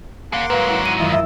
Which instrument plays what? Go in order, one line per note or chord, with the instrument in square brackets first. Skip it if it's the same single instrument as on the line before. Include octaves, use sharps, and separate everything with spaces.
[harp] A#3 [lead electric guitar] G#4 F5 [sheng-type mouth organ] F#5 C6 D6
[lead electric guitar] G#2 F#3 [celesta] B4 F5
[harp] C#4 E4
[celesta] D#7
[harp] F#2 D#3 E3 [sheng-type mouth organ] E4 F4 D#5
[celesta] E5 [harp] E6